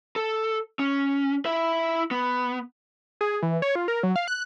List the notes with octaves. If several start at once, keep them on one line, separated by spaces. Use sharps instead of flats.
A4
C#4
E4 E5
B3
G#4
E3
C#5
F4
A#4
F#3
F5
F#6